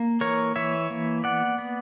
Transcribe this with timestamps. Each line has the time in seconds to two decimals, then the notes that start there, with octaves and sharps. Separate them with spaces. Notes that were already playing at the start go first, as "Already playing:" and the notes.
Already playing: A#3
0.21 E3 A#4 C#5
0.56 E3 C#5 E5
0.90 A#3
1.24 B3 D5 F#5
1.58 B3